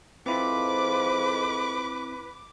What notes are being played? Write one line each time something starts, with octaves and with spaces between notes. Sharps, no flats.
F2 G#2 F3 C4 E4 B4 D6